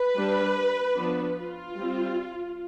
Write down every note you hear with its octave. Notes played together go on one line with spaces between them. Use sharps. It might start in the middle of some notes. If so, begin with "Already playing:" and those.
Already playing: B4
G3 D4
F3 B3 D4
F4
G3 C4